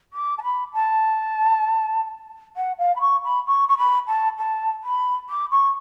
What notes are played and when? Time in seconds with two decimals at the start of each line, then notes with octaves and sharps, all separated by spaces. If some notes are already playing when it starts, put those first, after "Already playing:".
0.13 D6
0.38 A5
0.42 B5
0.73 A5
2.56 F#5
2.78 F5
2.95 B5
3.00 C#6
3.24 B5
3.46 C#6
3.68 C#6
3.77 B5
4.07 A5
4.38 A5
4.83 B5
5.29 D6
5.51 C#6